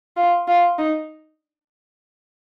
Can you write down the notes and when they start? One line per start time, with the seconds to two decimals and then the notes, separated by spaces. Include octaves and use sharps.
0.17 F4
0.48 F4
0.78 D#4